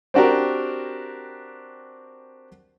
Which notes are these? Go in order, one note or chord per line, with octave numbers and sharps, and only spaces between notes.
C4 D4 F#4 G4 A#4